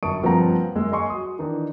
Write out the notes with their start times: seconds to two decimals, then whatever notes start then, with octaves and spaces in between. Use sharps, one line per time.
0.03 G1 F#2 A5 C#6 D#6 D7
0.23 G2 F3 A#3 C4 F#5 A#5
0.75 F#2 G#3 A#3 E6
0.92 D#5 G#5 C6 C#6
1.10 F#4 D#6
1.39 D#3 E3 D4 D#4